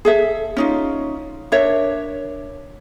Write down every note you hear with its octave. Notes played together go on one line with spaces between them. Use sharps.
G#4 A4 E5
C#4 D#4 F4
D4 A#4 C#5 E5